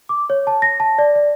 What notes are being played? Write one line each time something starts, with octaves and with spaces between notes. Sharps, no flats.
D6
C#5
A5
A#6
A5
D5
D5